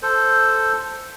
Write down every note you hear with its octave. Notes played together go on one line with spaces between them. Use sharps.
A4 C5